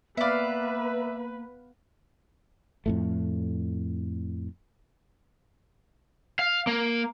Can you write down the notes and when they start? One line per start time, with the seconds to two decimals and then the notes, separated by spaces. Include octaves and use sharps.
0.17 A#3 B3 B4 D5 E5 F5
2.86 F2 A2 A3
6.39 F5
6.67 A#3